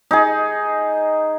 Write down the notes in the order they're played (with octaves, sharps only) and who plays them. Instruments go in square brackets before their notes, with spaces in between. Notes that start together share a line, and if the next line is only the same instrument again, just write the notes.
[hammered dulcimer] D#4 G#4